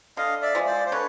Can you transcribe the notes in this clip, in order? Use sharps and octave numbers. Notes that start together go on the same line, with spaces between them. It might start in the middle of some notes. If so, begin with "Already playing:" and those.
D3 D#5 F5
D5 E5
F3 G#3
C5 D5
C5
D3 B4 C#5